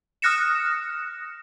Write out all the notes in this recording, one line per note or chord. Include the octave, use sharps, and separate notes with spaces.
D#6 F6 F#6 A#6 C#7 E7